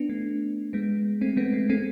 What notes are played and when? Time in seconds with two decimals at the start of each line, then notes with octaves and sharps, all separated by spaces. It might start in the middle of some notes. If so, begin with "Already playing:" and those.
Already playing: B3 D4
0.09 A3
0.73 G#3 B3
1.21 A3 C4
1.37 G#3 B3
1.53 A3
1.69 A3 C4